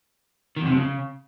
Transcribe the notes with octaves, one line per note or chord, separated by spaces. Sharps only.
D#3
E2
C3
F2
C#3